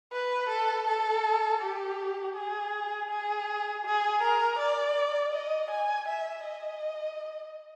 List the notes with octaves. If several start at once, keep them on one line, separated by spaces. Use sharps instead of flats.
B4
A4
A4
G4
G#4
G#4
G#4
A#4
D5
D#5
G#5
E5
D#5